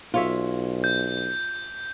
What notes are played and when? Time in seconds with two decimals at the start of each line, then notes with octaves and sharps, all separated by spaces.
0.14 B1 F4 C#5 E5
0.84 G6